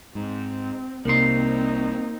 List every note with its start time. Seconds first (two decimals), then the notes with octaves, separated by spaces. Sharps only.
0.15 G#2 C4
1.05 C2 C3 A#3 C4 D#4 C6